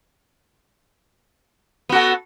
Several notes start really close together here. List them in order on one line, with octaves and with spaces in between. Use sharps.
B3 F#4 A4